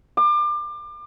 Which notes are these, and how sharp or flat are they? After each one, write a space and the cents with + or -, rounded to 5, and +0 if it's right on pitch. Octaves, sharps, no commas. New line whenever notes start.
D6 +30